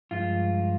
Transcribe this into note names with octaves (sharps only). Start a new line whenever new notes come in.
G2 F3 G#3 F4